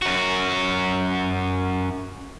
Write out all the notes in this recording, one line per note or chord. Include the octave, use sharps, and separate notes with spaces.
F#2 F#4